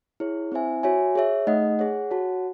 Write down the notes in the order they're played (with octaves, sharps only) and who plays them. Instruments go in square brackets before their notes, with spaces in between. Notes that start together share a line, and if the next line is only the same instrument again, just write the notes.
[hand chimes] E4 G#4 C#5
C4 E4 C5 E5 G#5
F#4 C#5 E5 G#5
G#4 C#5 E5
A3 D#4 G#4 D#5 F#5
G#4 C#5 F#5
F#4 C#5 F#5 A5